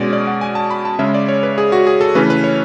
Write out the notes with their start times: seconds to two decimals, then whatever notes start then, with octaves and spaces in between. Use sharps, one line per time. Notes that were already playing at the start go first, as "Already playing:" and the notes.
Already playing: B2 G#3 C#4 D5
0.13 D5
0.27 F#5
0.41 G#5
0.55 A5
0.71 B5
0.85 A5
0.99 C#3 G#3 C#4 E5
1.14 D5
1.29 C#5
1.43 B4
1.58 G#4
1.72 F#4
1.87 G#4
2.01 A4
2.15 C#3 E3 A3 C#4 B4
2.30 B4
2.44 C#5